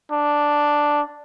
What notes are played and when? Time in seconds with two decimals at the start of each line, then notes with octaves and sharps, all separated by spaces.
0.12 D4